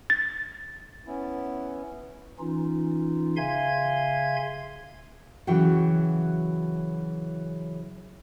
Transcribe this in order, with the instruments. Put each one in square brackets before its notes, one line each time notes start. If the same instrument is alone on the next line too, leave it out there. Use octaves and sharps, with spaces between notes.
[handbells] A6
[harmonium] B3 C#4 E4
[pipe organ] E3 C#4 D#4 F4
C#3 E5 F5 G#5 C6 G#6
[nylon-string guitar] C#3 E3 F#3 F#4 F#5 G5